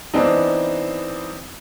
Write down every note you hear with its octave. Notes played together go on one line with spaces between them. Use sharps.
E3 B3 C4 D4 D#4